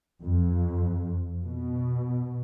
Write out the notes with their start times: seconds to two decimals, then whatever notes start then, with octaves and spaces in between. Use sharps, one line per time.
0.21 F2
1.47 B2